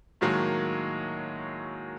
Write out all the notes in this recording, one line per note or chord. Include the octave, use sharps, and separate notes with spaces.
A2 D#3 F#3 G#3 A#3